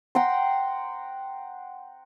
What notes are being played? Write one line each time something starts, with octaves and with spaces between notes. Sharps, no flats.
F#5 G5 A#5 C6